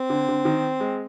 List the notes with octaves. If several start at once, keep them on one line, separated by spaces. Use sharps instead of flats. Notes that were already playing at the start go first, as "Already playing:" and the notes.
Already playing: C4
D3
D3
D#3
G#3